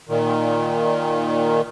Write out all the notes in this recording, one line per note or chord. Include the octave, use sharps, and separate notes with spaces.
A#2 D#3